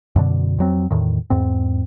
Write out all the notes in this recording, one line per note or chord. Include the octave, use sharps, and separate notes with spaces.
F#2 B2 D3
F2 F#3 C4
E2 A2 D#3
E2 G#2 C4